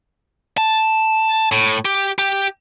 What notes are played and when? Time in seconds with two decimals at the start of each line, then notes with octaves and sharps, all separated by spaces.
0.58 A5
1.52 A2
1.85 G4
2.19 G4